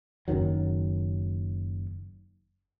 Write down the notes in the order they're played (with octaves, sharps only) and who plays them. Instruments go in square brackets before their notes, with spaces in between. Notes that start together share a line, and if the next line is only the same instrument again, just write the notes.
[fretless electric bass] F#1 F#2 D#3 F#3